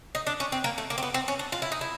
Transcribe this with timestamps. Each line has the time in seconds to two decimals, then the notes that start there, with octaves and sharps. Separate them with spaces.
0.15 D#4
0.27 D4
0.40 C#4
0.52 C4
0.64 A#3
0.78 A3
0.90 A#3
0.98 C4
1.03 B3
1.14 C4
1.28 C#4
1.39 D4
1.52 F4
1.62 E4
1.72 D#4
1.81 E4